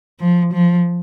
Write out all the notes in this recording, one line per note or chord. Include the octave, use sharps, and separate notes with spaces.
F3
F3